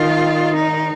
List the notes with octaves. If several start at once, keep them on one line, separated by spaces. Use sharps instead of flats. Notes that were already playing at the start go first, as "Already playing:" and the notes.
Already playing: D#3 F4
D#4